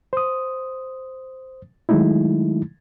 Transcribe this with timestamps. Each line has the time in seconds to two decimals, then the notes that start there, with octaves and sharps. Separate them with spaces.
0.13 C5 D#6
1.89 D#3 F#3 G#3 A3 D#4 E4